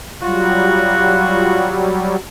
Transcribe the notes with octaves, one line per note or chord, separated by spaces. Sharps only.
F#3 G3 F4 F#4